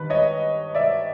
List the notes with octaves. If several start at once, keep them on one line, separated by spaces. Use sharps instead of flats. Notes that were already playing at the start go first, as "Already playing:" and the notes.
Already playing: G2 D#3 B4
C#5 D#5
D5 E5